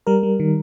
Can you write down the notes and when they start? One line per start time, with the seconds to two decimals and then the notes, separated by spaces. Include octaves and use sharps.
0.07 G3 A#4
0.23 G3
0.40 D#3